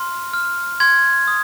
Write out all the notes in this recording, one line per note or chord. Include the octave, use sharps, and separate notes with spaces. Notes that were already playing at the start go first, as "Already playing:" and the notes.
Already playing: C6 F6
F6
C6 G#6
D#6